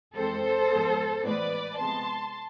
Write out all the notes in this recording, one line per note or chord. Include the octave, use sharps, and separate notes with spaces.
F2 E3 G#3 C4 A4 C5
G#2 F3 G#3 B3
A2 E3 G#3 B3 B4 D5
C3 F3 G#3 B3 A5 C6